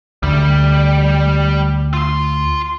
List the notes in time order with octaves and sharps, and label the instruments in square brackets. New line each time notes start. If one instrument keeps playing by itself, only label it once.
[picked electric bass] D2 [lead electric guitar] G3 D5
[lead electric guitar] F4 C6